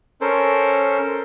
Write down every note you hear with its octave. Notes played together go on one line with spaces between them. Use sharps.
C#4 A4 A#4 C5